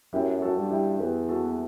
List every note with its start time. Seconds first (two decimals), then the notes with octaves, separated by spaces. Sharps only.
0.13 F#2 E4 G4
0.42 F#4 A4
0.57 G2
0.70 E4 G4
0.99 E2 G4 B4
1.28 F#4 A4